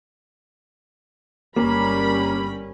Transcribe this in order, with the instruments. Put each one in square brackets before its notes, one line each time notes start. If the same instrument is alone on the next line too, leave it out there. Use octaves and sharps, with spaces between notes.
[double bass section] G1 C#4 [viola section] G3 A#4 B5 [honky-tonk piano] A#3